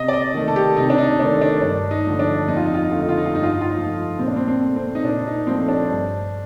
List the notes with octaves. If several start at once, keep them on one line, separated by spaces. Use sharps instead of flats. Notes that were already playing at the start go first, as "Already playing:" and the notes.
Already playing: C3 D#5
D5
D#5
D#3 A3
A4
G4
C3 D#4
D4
D#4
D#3 A3 D4
D4
G2 D4
D#4
D3 F3 A3
D4
F2 D#4
F4
D#4
F4
D#4
D3 A3 F4
D#4
F4
D#4
F4
G2 D#4
F4
D#4
F4
D#4
F3 A3
A#2 C4
D4
C4
C4
A3
C4
D#4
A#2 D4
D#4
F3 A3 C4
D4
G2